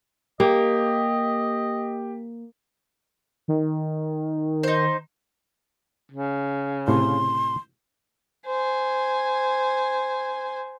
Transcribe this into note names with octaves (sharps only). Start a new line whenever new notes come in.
A#3 G4 D#5
D#3
D#4 C5
C#3
A2 C3 C6
C5 G#5